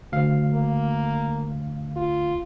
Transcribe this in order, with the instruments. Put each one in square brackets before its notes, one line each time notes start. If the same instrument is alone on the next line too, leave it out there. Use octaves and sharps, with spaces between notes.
[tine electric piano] D2 F5
[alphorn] A#3
F4